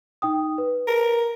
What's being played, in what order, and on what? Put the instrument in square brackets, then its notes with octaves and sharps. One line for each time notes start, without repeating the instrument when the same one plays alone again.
[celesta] D#4 G5 D#6
B4
[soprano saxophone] A#4